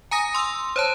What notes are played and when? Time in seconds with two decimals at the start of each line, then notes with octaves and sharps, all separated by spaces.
0.11 G#5 A#5 D#6 A#6
0.35 C6 E6
0.76 C5 C#5 A5